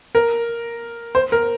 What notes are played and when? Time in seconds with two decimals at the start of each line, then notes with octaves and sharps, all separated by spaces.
0.15 A#4
1.15 C5
1.32 A#4